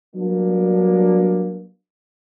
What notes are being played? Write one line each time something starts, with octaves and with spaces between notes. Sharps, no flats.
F#3 G3 A#3 B3 D4